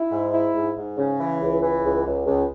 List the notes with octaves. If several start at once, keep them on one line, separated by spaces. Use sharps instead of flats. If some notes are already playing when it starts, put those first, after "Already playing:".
Already playing: E4
G#2
E4
G#2
G#2
C#3
E3
C#2
E3
C#2
C#2
C#2